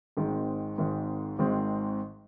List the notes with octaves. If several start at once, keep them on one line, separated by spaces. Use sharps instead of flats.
G#1 G#2 D#3 G#3 C4
G#1 G#2 D#3 G#3 C4
G#1 G#2 D#3 G#3 C4